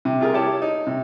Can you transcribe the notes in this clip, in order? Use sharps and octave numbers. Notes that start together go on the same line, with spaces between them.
C3
F4 G#4 A#4
E4 G4 C#5 A5
D#4
C3